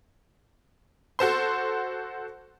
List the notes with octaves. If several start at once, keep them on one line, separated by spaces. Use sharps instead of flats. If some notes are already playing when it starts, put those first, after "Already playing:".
F#4 A4 C5 C6